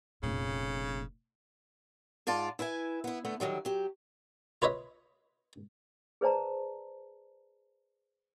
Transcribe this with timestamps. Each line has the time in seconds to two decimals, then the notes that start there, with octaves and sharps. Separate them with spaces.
0.23 F1 A#2 C#3
2.27 G#2 F4 D5 A5
2.59 E4 B4 E5 G#5
3.04 B3 E4
3.25 D3 A3 B3
3.40 D3 D#3 F#3 G3
3.65 F#3 G4
4.62 F4 B4 C#5 D#5 E5
6.21 G#4 B4 C5 D5 A5 A#5